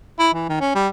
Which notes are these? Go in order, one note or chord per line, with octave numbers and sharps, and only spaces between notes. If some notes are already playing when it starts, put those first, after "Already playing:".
E4
E3
D#3
C#4
G3